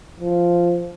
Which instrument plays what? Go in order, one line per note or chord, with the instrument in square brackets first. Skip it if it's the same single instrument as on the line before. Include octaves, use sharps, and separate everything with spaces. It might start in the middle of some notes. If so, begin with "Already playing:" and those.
[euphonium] F3